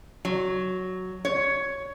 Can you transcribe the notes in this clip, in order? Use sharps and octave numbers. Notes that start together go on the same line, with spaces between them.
F#3
C#5